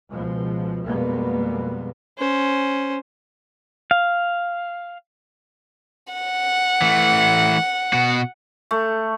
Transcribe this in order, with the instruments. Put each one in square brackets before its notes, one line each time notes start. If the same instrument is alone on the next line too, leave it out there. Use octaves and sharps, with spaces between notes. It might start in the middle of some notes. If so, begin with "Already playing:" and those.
[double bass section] C#2 B2 F3 G#3
F2 B2 G3 G#3 A#3 B3
[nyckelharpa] C#4 C5
[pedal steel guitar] F5
[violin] F#5
[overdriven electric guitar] E3 A3
B2 F#4
[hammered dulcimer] A3